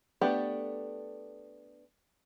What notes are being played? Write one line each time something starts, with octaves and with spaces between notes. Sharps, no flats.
A3 B3 D4 G4